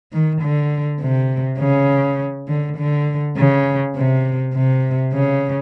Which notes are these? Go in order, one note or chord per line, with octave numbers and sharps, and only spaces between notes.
D#3
D3
C3
C#3
D3
D3
C#3
C3
C3
C#3